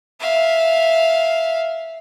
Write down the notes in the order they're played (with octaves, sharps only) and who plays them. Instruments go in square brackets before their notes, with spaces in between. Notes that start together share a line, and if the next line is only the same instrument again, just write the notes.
[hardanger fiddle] E5 F5